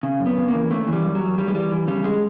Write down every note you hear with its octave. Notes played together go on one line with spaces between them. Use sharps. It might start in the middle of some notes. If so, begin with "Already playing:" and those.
C#3
F#2
B3
C#3
A#3
E3
C#3 A3
E3
G3
F#2
F#3
F#2
F#2 G3
G#3
E3 G3
E3
C#3 G3
G#3